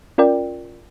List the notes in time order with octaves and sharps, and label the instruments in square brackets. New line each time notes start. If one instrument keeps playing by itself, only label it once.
[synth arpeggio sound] C#4 F4 A#4 D5 G5